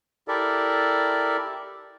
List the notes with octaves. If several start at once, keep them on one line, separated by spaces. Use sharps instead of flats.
E4 G4 A4 A#4 D5 E5